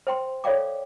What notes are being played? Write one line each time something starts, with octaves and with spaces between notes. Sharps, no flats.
C5 G5 C6
A4 C#5 D5 F5 G5 D6